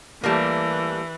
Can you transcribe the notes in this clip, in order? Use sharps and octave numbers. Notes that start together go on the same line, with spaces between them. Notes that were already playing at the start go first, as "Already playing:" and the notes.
E3 G3 A3 A#3